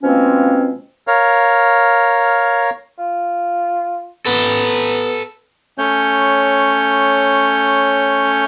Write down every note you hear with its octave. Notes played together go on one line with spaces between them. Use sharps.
B2 F3 G#3 A#3 C4 C#4
A#4 C#5 F5
F4
B3 A4 B4
A3 C#4 C#5 G6